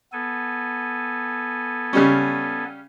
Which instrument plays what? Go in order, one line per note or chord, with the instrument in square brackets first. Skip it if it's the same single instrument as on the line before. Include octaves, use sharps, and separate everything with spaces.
[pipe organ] B3 A4 G#5
[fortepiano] C#3 G3 C#4